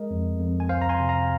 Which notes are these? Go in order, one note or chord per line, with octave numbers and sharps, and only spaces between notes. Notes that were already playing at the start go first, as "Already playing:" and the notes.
Already playing: G#3 A#4 D#5
F2
F2
G#5
C2 C5 F5
A#5
G#5 C6
C3
F5 A#5